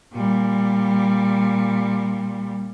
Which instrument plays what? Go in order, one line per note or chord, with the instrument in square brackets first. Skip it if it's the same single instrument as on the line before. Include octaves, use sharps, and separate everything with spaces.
[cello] A#2 G3